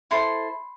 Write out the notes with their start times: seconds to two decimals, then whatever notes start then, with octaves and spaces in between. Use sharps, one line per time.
0.11 E4 A4 C5 C6